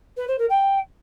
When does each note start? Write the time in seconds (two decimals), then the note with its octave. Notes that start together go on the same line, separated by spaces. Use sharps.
0.17 B4
0.28 C5
0.39 A#4
0.49 G5